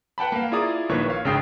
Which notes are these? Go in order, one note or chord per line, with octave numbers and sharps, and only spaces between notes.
B4 F#5 G5 A5 B5
A#3 F5
E4 F4 G#4 D5 A#5 D#6
A#1 D#3 A#3 B4 C#5 C#6
C#5 F5
G#1 C#3 D4 G5 D#6 C7